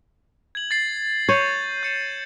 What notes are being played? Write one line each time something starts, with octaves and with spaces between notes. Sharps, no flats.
G#6 F#7
A6 C7
C#5 G6 D#7 F#7
G6 C#7 E7